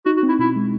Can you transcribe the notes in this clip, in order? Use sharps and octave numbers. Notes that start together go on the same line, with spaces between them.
D#4 F#4
F#4
C4
E4
B2 E4
G#3